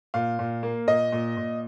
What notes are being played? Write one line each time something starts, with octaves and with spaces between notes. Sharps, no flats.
A#2 F5
A#2
A#3
A#2 D#5
A#2
A#2